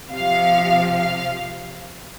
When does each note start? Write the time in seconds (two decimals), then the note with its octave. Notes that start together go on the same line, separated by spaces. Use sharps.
0.11 C3 F3 F5
0.96 F5